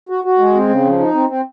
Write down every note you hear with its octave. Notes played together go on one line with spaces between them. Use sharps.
F#4
F#4
G#3
C4
C#3
F3
D#4
C4
C4